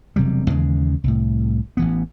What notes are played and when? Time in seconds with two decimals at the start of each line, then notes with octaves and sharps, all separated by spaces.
0.16 E1 C3 F#3 G3
0.48 D#2 C#3 E3 G#3
1.04 C2 A2
1.77 A1 E3 B3